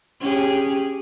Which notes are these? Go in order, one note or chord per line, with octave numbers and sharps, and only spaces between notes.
C#4 G4 G#4